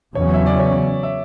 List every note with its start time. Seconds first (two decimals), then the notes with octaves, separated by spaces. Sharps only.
0.15 E2 C#3 F#3 C#4 C#5
0.34 E5
0.46 D5
0.59 C#5
1.03 E5